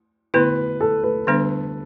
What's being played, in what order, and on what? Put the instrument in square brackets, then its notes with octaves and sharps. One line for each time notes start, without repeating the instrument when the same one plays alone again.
[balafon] D3 B3 E4 [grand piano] B4
[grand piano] A4
B4
[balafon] D3 G3 B3 D4